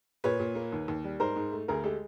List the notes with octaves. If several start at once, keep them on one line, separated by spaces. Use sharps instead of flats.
A#2 B4 C#5
A#2
A#3
D#2
D#2
G3
G#2 A#4 C5
G#2
A3
D2 G#4 A#4
G#3 G4 A4